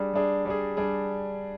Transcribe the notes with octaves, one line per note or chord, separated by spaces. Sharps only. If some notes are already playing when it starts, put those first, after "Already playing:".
Already playing: G3 D4 G#4
G3 D4 G#4
G3 D4 G#4
G3 D4 G#4